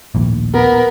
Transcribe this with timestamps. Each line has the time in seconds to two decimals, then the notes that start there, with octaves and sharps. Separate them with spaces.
0.15 A#1 D#2 A2
0.54 B3 A#4